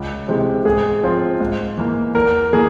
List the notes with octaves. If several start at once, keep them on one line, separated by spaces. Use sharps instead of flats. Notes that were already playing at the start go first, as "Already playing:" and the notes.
Already playing: C#2
C3 E3 G#3 C4
G#2 G#4
F3 C4 F4
G#2
E3 A#3
E2 A#4
E3 A#3 G#4